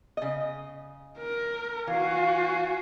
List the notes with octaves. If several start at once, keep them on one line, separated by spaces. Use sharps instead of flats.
C#3 D#5
A#4
E3 F#4 F5 G#5